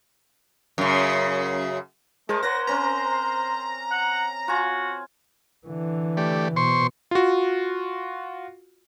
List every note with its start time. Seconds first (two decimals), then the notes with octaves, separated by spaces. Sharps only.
0.78 F#2 C#3
2.29 G#3 A3 A#4 C5 A5
2.43 A#4 C5 C#5 F#5 A#6
2.67 C4 C#4 A#4 A#5
3.91 F#5
4.48 F4 F#4 G#5
5.67 D3 E3
6.17 A3 G4 D5
6.56 B2 C5 C6 C#6
7.11 F4 F#4